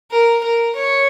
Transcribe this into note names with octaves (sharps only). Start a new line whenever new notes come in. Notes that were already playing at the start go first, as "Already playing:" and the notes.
A#4
A#4
C#5